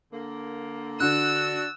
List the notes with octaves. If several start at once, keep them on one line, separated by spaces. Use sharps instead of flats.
D3 A#3
D3 D4 F#4 E6 F#6